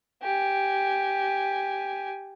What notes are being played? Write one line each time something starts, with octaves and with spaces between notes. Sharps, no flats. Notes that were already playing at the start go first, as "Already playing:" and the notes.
G4 G#5